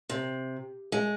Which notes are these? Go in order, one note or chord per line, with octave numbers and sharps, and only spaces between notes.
C3
G#3